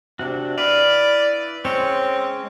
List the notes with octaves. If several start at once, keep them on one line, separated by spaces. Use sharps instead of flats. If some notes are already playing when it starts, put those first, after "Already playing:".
C3 D4 F#4
E4 B4 D5 F5
G#3 C4 C#4 C#5